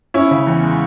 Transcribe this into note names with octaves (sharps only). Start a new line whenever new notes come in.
C#4 E4
C#3
E2
G#3